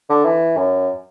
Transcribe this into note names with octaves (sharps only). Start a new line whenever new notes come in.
D3
E3
F#2